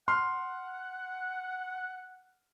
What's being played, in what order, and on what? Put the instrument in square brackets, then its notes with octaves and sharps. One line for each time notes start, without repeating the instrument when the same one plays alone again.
[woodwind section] F#5 [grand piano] C6 F6